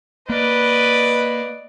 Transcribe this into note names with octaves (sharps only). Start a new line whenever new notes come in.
A#3 B4 D5 D#5